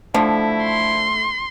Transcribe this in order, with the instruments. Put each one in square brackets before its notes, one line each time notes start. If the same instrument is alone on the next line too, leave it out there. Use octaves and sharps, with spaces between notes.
[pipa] D3 F3 [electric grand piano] A3 [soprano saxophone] E4
[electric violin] C6